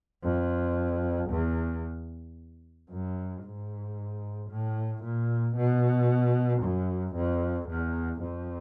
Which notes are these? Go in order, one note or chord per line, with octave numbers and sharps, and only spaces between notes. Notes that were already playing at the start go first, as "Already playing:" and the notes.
F2
E2
F#2
G#2
A2
A#2
B2
F#2
F2
E2
F2